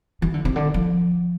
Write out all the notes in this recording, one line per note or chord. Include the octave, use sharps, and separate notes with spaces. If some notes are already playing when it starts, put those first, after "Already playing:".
E3
D3
C3
D3
F3